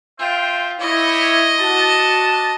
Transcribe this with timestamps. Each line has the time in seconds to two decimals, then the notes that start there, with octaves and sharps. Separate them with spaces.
0.19 F4 C5 E5 G5
0.80 G3 E4 C#5 D#5
1.60 D4 F#4 A5